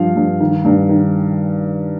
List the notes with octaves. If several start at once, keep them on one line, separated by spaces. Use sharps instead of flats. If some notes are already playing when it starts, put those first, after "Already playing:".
Already playing: G2 F3 F5
G2
D#3
G2
D#3